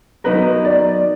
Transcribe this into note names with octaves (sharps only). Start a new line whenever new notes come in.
F#3 B3 D#4 A#4 B4
D5